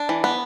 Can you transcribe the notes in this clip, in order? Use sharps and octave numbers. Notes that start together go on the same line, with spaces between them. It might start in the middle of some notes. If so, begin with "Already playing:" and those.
Already playing: D4
E3
B3